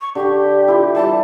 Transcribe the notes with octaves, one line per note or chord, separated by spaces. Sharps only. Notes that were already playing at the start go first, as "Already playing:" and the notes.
C#6
D3 G4
E4 F4
E3 G3 D4 A5